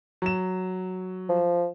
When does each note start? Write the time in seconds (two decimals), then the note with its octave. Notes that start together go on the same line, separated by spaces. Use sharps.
0.22 F#3 E7
1.29 F3